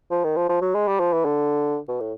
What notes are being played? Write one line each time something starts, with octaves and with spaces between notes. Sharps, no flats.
F3
D#3
F3
F3
F#3
G#3
G3
F3
E3
D3
B2
A2